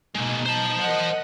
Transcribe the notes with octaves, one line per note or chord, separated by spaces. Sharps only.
B2 G#3 A#3 D#4
C5 A5
A#4 D#5 F#5